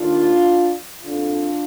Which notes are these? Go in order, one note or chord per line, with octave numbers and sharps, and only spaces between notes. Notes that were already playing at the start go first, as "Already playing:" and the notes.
Already playing: D#2 D#3 D4 F4
F2 D3 D4 F4